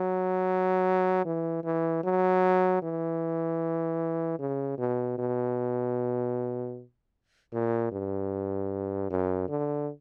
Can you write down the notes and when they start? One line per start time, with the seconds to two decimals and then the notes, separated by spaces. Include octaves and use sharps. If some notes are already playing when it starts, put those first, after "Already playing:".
Already playing: F#3
1.25 E3
1.64 E3
2.03 F#3
2.82 E3
4.39 C#3
4.78 B2
5.18 B2
7.53 A#2
7.92 G2
9.10 F#2
9.49 D3